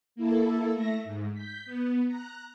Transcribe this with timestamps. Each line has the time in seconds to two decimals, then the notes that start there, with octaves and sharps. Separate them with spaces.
0.16 A#3 E4 A4
0.72 A3 E5 A#6
1.04 G#2
1.33 G6 B6
1.66 B3
2.07 A#5 F#6